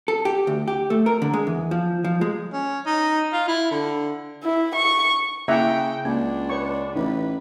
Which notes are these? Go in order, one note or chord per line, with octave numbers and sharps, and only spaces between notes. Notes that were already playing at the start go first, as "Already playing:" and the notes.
A4
G4
D2
G4
A3
A#4
D3
G#3
E2
F3
F3
G#3
C#4
D#4
F4
E4
D3
E4
C#6
C#3 A#3 E4 E5 F#5 G5 A#5
C#2 A#3 D4
B4 C#5 C#6
A1 D#4 B4 D5